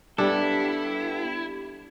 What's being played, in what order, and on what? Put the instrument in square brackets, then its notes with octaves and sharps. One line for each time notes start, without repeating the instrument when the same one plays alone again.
[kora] G3 D4 [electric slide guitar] B3 A4 [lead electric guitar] E4 [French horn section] G4